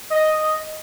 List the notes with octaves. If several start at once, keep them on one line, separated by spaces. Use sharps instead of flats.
D#5